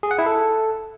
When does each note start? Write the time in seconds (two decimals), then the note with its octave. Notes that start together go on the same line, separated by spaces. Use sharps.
0.03 G#4
0.11 F#5
0.19 E4
0.26 A4